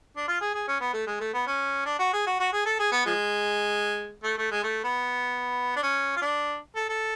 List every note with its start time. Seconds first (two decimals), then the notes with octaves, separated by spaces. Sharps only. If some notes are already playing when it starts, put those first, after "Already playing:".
0.16 D4
0.28 F4
0.41 G#4
0.54 G#4
0.68 C#4
0.81 B3
0.93 A3
1.07 G#3
1.20 A3
1.34 B3
1.47 C#4
1.86 D4
1.99 F#4
2.13 G#4
2.26 F#4
2.40 F#4
2.53 G#4
2.66 A4
2.79 G#4
2.92 B3
3.06 F3 G#3
4.24 A3
4.38 A3
4.51 G#3
4.64 A3
4.84 B3
5.76 D4
5.83 C#4
6.16 F4
6.22 D4
6.75 A4
6.89 A4